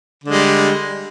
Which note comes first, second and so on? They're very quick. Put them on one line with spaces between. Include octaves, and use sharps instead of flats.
D3 G#3 G3